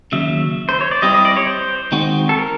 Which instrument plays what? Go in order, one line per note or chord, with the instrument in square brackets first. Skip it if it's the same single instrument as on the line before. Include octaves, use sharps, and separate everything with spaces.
[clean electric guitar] D#2 C#3 F#3 [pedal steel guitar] E5
[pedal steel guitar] C5
C#5
D5
[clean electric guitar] G3 C4 E4 [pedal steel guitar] D#5
[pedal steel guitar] D#5
D5
C#5
C5
[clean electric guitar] D#3 G#3 C4 D#4 F#4
[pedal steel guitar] A4
A#4